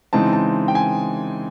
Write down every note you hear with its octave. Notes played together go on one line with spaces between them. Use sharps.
C#3 E3 G#3 C4 D#4 A5
A5
G5
G#5